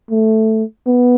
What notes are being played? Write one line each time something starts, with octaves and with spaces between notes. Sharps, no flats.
A3
B3